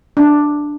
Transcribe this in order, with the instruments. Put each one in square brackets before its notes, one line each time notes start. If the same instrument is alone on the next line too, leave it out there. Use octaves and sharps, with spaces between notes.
[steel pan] D4